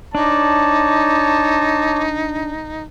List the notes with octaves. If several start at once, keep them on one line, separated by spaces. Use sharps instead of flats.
D4 D#4 C#5 A5 D6